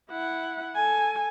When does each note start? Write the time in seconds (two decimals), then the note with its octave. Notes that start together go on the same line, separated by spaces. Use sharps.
0.10 E4 F#5
0.75 A4 G#5